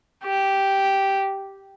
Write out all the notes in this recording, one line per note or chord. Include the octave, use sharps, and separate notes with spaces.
G4